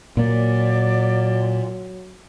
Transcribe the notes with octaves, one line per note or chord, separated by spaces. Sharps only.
A#2 F#3 A#3 D5